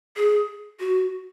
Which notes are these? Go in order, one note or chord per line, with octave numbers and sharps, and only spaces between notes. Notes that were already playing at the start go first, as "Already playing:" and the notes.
G#4
F#4